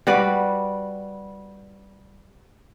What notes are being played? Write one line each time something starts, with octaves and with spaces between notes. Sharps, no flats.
G3 F#4 B4 D5